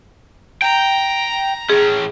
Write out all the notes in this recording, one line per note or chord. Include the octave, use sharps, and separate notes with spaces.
G5 A#5
A2 C#4 G#4